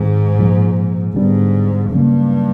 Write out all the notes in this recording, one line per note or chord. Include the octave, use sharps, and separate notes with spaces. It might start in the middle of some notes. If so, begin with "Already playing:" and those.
Already playing: G#2 D#3 G#3 C4
A#2 F3 G#3
G#2 D3 G3 B3 D4
G2 C#3 F#3 A#3